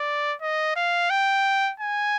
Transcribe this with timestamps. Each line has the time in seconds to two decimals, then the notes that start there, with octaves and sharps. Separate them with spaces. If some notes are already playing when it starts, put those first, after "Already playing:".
Already playing: D5
0.42 D#5
0.76 F5
1.10 G5
1.80 G#5